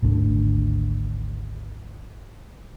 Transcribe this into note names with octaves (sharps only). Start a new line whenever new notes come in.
G#1 D2 D3